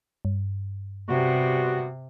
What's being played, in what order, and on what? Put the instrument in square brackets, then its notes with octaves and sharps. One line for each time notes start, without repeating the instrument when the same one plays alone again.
[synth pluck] G2
[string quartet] C3 [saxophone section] G3 B3 F#4